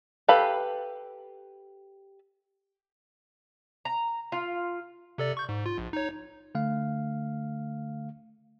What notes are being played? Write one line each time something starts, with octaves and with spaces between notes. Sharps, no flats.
G4 A4 B4 F5 B5
A#5
F4
C3 A4 D5
C#6 G6
G#2
F4
A#1
D#4 C#5
D3 A3 F5